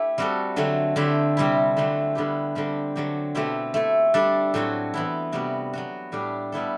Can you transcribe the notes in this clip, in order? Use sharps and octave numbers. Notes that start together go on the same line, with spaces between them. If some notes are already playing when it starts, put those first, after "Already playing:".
Already playing: A3 D4 E4 G4
G3 C4 F#4 A4
D3 F#3 A3 C4
D3 A3 C4 E4 G4
C3 G3 C4 E4
D3 F#3 A3 C4 G4
D3 G3 B3 E4 G4
D3 G3 C4 G4
D3 F#3 C4 G4
B2 A3 C4 E4 G4
A3 E4 A4
G3 D4 A4
A2 F#3 C4 F#4
E3 B3 E4
C3 G3 B3 F#4
F#3 B3 F#4
A2 G3 D4 G4
G3 B3 E4 A4